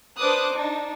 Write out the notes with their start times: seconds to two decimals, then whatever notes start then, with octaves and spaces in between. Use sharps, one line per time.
0.18 D4 B4 C5 D6 D#6 F#6
0.54 D4 D#4